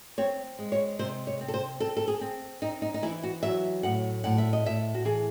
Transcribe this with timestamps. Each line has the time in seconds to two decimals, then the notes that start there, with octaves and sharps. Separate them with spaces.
0.18 C4 C#5
0.59 G#3
0.72 C#5
0.99 C3 C5
1.27 C#5
1.41 C4
1.48 A4
1.54 C5
1.80 C4 A4
1.97 A4
2.08 G#4
2.21 C4
2.62 C4 D#4
2.82 D#4
2.94 D#4
3.02 E3 E4
3.23 F#4
3.43 F#3 E5
3.83 A2 F#5
4.24 A2 F#5
4.38 E5
4.53 D#5
4.66 A2 E5
4.95 F#4
5.05 E3 G#4